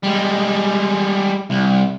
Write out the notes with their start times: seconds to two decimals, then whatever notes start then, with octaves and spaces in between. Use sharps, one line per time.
0.03 G3 G#3
1.50 C2